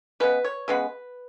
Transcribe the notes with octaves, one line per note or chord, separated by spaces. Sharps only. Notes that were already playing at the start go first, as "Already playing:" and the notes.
C#3 G#3 B3 B4
C#5
C#3 G#3 B3 B4